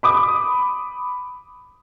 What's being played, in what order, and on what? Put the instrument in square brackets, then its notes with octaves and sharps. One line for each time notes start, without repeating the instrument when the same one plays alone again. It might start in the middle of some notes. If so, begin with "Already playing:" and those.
[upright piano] B5 D6 D#6